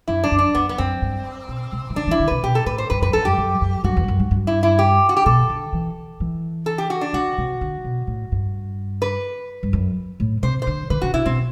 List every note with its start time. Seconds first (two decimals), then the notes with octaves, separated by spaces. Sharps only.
0.08 F#2 E4
0.24 D4
0.31 F#2
0.39 D4
0.55 F#2 B3
0.69 B3
0.78 F#2 C4
1.02 G2
1.48 B2
1.72 C3
1.90 E3
1.96 D3 D4
2.07 E3
2.11 E4
2.20 D3
2.28 C3 B4
2.43 B2 G4
2.55 A4
2.66 A2 B4
2.78 C5
2.90 G2 B4
3.01 F#2 B4
3.13 E2 A4
3.25 F#2 G4
3.38 F#2
3.61 F#2
3.84 F#2 F#4
3.97 E2
4.04 G2
4.08 F#2
4.19 G2
4.31 G2
4.47 E4
4.63 E4
4.79 G4
5.09 F#4
5.17 G4
5.26 B2 A4
5.50 D3
5.73 E3
6.20 E3
6.66 A4
6.78 G4
6.90 F#4
7.01 D4
7.13 D3 F#4
7.38 C3
7.61 D3
7.84 B2
8.07 A2
8.32 G2
9.02 B4
9.63 G2
9.73 F#2
10.20 A2
10.43 C3 C5
10.62 C5
10.67 D3
10.90 D3 B4
11.02 C3 F#4
11.13 C3 E4
11.26 B2 C4